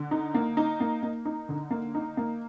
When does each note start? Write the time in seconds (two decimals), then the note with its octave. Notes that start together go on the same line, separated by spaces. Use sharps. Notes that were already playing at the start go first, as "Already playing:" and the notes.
Already playing: D3
0.11 D#4
0.35 A#3
0.57 D#4
0.80 A#3
1.03 A#3
1.25 D#4
1.49 D3
1.71 A#3
1.95 D#4
2.17 A#3